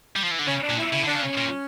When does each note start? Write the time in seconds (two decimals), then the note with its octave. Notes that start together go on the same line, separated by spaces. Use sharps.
0.16 G3
0.23 F3
0.31 E3
0.39 D3
0.46 C#3 C#4
0.62 D4
0.70 A#2
0.77 E4
0.92 C#3 E4
1.03 D3 D4
1.15 C#3
1.22 C#4
1.37 A#2